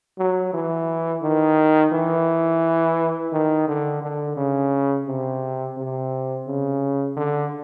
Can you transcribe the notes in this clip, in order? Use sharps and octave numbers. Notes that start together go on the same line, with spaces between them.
F#3
E3
D#3
E3
D#3
D3
D3
C#3
C3
C3
C#3
D3